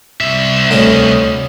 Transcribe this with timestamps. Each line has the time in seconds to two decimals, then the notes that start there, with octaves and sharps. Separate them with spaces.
0.21 C2 E5
0.71 D2 C#4 D#5